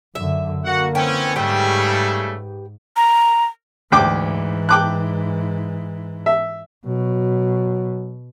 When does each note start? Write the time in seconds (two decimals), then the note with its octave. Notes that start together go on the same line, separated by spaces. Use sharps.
0.15 F#2 D3 E5
0.65 D3 A#3 F#4 F#5
0.95 E3 C4 C#4 G5
1.36 G#2 C#3 G3 A3 G4 B4 G5
2.96 A#5
3.92 D2 G#2 E3 G5 D6
4.69 G5 D6 F#6
6.26 E5
6.87 B2 F#3